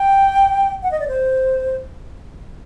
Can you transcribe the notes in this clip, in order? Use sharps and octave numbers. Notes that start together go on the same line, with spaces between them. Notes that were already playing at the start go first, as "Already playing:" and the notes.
Already playing: G5
F#5
D#5
D5
C5